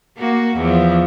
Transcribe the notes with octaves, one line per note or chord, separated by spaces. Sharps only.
A#3 F#4
E2 F3